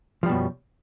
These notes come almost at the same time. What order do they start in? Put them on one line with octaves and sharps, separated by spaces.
F3 G3 B2 F#2